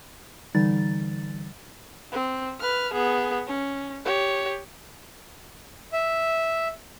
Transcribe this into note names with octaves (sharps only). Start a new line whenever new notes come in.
D3 E3 G3 D#4 A6
C4
B4 F6
B3 G#4
C#4
G4 C#5
E5